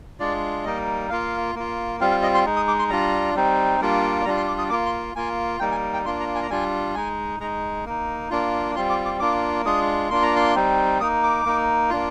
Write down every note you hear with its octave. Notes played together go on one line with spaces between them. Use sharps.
G#3 D4 F4 D5
G3 A#3 D#4 D#5
A#3 F4 F5
A#3 F4
G3 C4 F4 F5
F5
D#5
C6
G#3 D#4
D#6
D6
C6
G3 D4 F4 A#5
G3 C4 D#4
G3 A#3 D4 F4
G3 D4 F4 A#5
C6
D6
D#6
A#3 F4 D6
C6
A#3 F4 G#5
G3 A#3 D#4 G5
G#5
G5
A#3 D4 F4 C6
A#5
G#5
A#5
G3 D4 F4 G#5
G#3 D#4 G#5
G#3 D#4 A#5
A#3 D#4
A#3 D4 F4
G3 C4 F4 C6
D6
D6
A#3 D4 F4 D6
G#3 D4 F4 D#6
A#3 D4 F4 C6
A#5
C6
G3 C4 D#4
A#3 D#4 D#6
D6
A#3 D#4
A#3 D4 F4